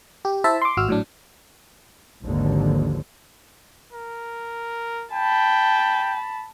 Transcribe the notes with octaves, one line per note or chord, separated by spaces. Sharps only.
G4
E4 C5 E5 A5
C6 D6
G#1 F#4 E6 F6
A2 F#3 D4
G#1 D#2 D3 F3
A#4
G5 A5 B5